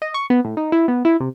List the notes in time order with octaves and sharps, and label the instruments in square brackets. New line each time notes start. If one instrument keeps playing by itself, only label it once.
[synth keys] D#5
C#6
B3
A2
D#4
E4
B3
E4
C3